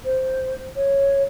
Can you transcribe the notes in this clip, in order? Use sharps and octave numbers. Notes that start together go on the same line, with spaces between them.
C5
C#5